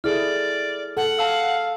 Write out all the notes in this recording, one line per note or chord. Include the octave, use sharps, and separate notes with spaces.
E4 G#4 A4 D5 F6
A4 F#5
F5 A5 E6